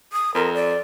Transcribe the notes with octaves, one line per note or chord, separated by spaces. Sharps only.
D#6
F2 A#4
D5